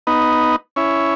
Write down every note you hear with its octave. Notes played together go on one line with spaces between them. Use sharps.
B3 D#4
C#4 E4